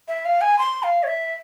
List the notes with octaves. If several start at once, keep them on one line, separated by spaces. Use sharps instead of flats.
E5
F5
G#5
C6
F5
C#5
E5